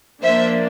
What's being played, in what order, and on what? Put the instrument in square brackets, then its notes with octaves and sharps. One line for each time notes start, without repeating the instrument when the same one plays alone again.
[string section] F3 A#3 D4 C5 E5